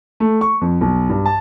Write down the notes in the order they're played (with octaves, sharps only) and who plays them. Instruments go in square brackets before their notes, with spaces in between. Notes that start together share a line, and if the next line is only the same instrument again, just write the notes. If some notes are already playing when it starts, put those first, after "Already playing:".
[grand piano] A3
C#6
F2
B1
G2
A5